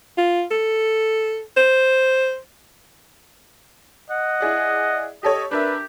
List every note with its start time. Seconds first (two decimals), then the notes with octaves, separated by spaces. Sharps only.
0.18 F4
0.51 A4
1.57 C5
4.11 D#5 F#5
4.40 E4 G#4 D5
5.23 G4 A4 C#5 D#5
5.51 D4 G4 A#4 B4 E5